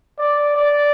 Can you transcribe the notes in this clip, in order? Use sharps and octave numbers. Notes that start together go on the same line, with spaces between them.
D5
D5